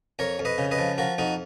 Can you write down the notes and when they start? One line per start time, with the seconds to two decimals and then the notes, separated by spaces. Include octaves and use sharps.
0.19 F2 A#4 C#5
0.39 F2
0.45 B4 D#5
0.58 C#3
0.71 B4 D#5
0.78 F3
0.98 F3 F#4 A#4
1.18 F2 D#4 F#4